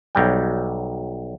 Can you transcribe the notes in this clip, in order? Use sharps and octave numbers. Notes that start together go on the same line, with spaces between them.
B1 F#3 G3 G5